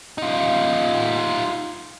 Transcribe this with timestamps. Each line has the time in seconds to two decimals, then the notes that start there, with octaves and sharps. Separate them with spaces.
0.18 D#4 F4